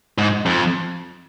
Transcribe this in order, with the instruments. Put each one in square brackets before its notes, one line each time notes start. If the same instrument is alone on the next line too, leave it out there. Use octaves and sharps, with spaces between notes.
[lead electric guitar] G#2
F2